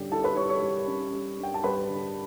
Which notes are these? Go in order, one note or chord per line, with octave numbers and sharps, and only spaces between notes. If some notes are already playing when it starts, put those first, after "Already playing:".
Already playing: D3 G3 C#4 G4
E4 A4 A5
B4 B5
G3 C#5 C#6
C#5 C#6
G3
C#4
G3
D4 G5
A5
G3 B4 B5
D3